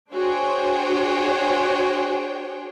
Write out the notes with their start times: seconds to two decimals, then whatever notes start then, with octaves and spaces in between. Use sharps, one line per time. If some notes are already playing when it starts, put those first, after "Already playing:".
0.12 D4 F#4 G#4 C5 C#5 G5